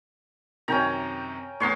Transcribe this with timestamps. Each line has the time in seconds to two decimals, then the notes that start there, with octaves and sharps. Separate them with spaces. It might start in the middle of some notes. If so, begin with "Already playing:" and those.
0.68 F#2 C3 D#3 C#4 G5 A#5
1.60 E2 A2 C#5 C6